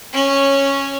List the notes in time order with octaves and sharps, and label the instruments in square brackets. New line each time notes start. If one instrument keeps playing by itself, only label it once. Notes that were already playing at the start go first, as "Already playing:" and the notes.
[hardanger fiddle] C#4 C#5